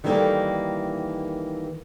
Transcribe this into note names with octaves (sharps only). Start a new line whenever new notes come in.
D#3 E3 G3 A#3 A4